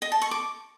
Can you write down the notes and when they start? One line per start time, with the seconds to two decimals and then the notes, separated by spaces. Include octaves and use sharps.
0.02 D#5
0.12 A5
0.22 C#6
0.31 D6